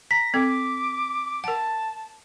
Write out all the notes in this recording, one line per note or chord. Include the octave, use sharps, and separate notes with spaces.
A#5 A#6 B6
C4 A4 D6
A#4 F#5 A5